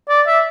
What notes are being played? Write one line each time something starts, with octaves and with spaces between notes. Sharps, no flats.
D5
E5